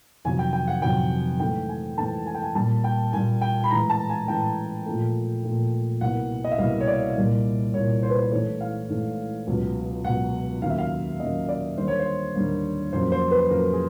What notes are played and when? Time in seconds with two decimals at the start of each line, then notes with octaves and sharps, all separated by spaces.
0.25 F2 C3 D#3 F#3 G#5
0.39 G5
0.53 G5
0.68 F#5
0.82 F2 C3 D#3 F#3 G5
1.40 G#2 E3 A3 G5
1.69 G#5
1.98 G#2 E3 A3 A5
2.26 G#5
2.35 G5
2.42 G#5
2.55 A#2 G3 A#3 A5
2.84 G5
3.13 A#2 G3 A#3 G#5
3.42 G5
3.64 B5
3.70 A2 E3 G#3 A#5
3.90 A5
4.09 G#5
4.28 A2 E3 G#3 G5
4.86 A#2 F3 A3
5.44 A#2 F3 A3
6.01 C2 B2 G3 A#3 F#5
6.44 D#5
6.52 E5
6.58 C2 B2 G3 A#3 F5
6.80 C#5
6.88 D5
7.16 C2 A#2 G3 A#3
7.74 C2 A#2 G3 A#3 C#5
8.03 C5
8.10 B4
8.18 C5
8.32 G#2 E3 A3 C#5
8.61 F5
8.89 G#2 E3 A3
9.47 C#2 B2 F#3
10.05 C#2 B2 F#3 F#5
10.62 D#2 C#3 F#3 A#3 F5
10.70 E5
10.78 F5
11.19 D#2 C#3 F#3 A#3 D#5
11.49 D5
11.77 D#2 D3 G3 A#3 C5
11.88 C#5
11.99 C5
12.35 D#2 D3 G3 A#3
12.93 F2 C#3 F#3 A#3 C5
13.12 C5
13.31 B4
13.50 F2 C#3 F#3 A#3 A#4
13.73 G#4